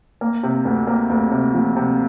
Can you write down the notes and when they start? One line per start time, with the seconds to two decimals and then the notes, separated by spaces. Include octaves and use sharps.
0.21 A#3
0.43 C3
0.65 D2
0.87 A#3
1.10 D2
1.31 C3
1.54 F3
1.76 C3